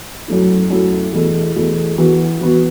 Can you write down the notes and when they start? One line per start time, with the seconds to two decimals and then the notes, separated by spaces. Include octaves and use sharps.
0.28 F#2 F#3 A3 E4
0.70 F#2 F#3 A3 E4
1.13 E2 B2 A3 E4
1.56 E2 B2 A3 E4
1.98 E3 B3 F#4
2.41 E3 B3 F#4